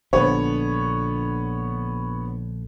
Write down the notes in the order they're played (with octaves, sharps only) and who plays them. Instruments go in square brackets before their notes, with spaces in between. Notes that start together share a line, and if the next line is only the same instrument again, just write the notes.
[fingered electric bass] A#1 D3 [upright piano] B3 C#5